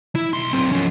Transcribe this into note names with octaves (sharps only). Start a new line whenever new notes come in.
E4
B1 C6
F#3 C4
F3 C#4